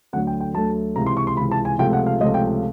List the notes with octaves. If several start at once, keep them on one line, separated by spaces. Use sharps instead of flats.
D2 D3 F#3 A3 F#5
G5
G5
D2 D3 F#3 A3 A5
C#2 C3 E3 A#5
C6
C#6
C6
C#2 C3 E3 B5
A5
G#5
C#2 C3 F3 A3 G5
F#5
F5
C#2 C3 F3 A3 D#5
G5